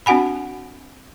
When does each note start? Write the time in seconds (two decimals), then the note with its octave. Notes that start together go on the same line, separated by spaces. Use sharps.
0.06 C4 D4 F#4 F#5 G#5 B5